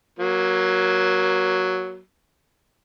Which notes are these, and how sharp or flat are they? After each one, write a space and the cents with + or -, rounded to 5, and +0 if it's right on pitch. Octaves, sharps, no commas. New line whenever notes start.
F#3 +5 A#3 +20